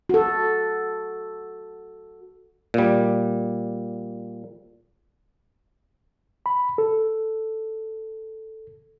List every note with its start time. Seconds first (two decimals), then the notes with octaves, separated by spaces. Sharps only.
0.09 F#4 A4
2.74 A#2 G3
6.46 B5
6.78 A4